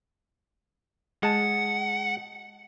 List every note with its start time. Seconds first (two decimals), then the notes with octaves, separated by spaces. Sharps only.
1.23 G#3 F#5 A5